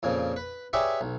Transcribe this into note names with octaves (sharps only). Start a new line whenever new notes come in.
F2 A#2 C#3 F3
B4
G4 G#4 B4 C#5 D5 E5
B1